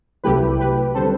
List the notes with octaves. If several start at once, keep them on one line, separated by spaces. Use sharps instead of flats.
C2 C3 F#3 A3 E4 G4 B4
G4 B4
D3 G3 C4 A4 C5